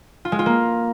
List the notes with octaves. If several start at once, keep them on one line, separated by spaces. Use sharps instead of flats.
F4
G#3
F4
A#3